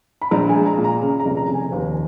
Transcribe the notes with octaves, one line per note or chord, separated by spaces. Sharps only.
B5
A#1 A#5
G#5
G#3
A#5
A#2
A#5
C#3
A#5
F1
A#5
F1
G#5
D#2 B4